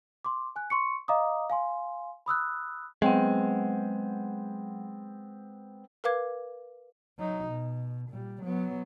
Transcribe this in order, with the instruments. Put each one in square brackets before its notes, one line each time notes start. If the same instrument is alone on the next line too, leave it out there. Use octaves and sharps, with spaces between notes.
[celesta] C6 D6
G#5 F#6
C6 C#6 C#7
D#5 F5 A#5 D6 D#6
F5 G#5 C6
B5 D#6 E6 F#6
[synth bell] F#3 F#5 [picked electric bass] G#3 [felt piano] B3 C4 G5
[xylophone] A#4 B4 F5 D6 G#6
[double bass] F#3 D#4
B2
A#2 G3
F#3 B3